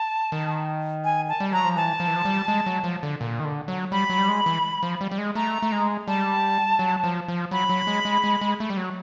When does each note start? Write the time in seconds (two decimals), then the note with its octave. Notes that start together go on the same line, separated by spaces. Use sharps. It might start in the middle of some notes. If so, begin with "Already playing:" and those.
Already playing: A5
0.32 D#3
1.05 G#5
1.29 A5
1.40 G3
1.52 F#3 A#5
1.65 F3
1.76 E3 A5
2.00 F3
2.08 E3
2.16 F3
2.25 G3
2.48 G#3
2.66 F#3
2.84 F3
3.03 D3
3.21 A#2
3.40 D#3
3.45 D3
3.68 F#3
3.92 G3 B5
4.10 F#3
4.18 G3
4.28 G#3
4.46 E3
4.83 F3
5.01 G3
5.11 G3
5.18 G#3
5.35 A3 A#5
5.62 A3
5.72 G#3
6.08 G3 A5
6.79 F#3
7.04 F3
7.28 F3
7.51 F#3 B5
7.70 F#3
7.87 G#3
8.05 G#3
8.24 G#3
8.41 G#3
8.60 A3
8.70 G3
8.77 F#3